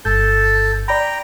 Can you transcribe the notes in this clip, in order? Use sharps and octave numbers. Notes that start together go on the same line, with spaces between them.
G1 G2 A4 G6
D5 G5 A#5 B5